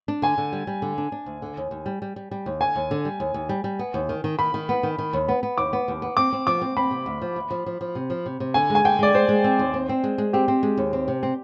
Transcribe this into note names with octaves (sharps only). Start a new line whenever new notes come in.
D4
D3 G#5
D3
G3
G3
D3
D4
D4
D2
D3
D#2
D#2
G3
G3
G3
G3
D#2
D3 G#5
D#2
D3
G3
D#2
D#2
G3
G3
B3
D#2
D#3
D#3
D#3 B5
D#3
B3
D#3
D#3
D#2
B3
B3
D#2 D6
B3
D#2
B3
C4 D6
C4
F3 D6
C4
C4 B5
C3
D2
F3
D2
F3
F3
F3
C3
F3
C3
C3
D3 G#5
G#3
G#5
D3 G5
G#3 D5
G#3 C5
G#3
C4
D#2
C4
C4
G#3
G#3
C4 G4
C4
G#3
D#2
C4
C3
C4